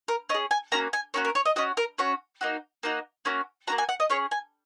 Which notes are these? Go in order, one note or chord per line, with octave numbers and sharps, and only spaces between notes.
A#4
C#4 D#5
G#4
G#5
A#3 C#4 F#4 A#5
G#5
A#3 C#4 F#4 C#5
A#4
C#5
D#5
C#4 F#4 D#5
A#4
C#4 F#4 C#5
A#3 D#4 F#4
A#3 D#4 F#4
A#3 C#4 F#4
A#3 C#4 F#4 A#5
G#5
F#5
D#5
C#4 G#4 C#5
G#5